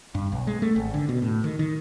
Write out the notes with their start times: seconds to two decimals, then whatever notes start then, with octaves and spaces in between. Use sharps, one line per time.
0.15 G2
0.32 B1
0.47 G#3
0.62 A3
0.76 G#1
0.94 D3
1.09 B2
1.22 A2
1.44 D#3
1.59 D#3